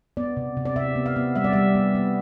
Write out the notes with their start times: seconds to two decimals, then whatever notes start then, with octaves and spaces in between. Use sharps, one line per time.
0.17 B3 D5
0.37 C3
0.57 C3
0.65 D5
0.76 C3 E5
0.96 B3
1.06 F5
1.16 B3
1.35 G3 E5
1.44 D5
1.53 G3 E5
1.75 B3
1.95 B3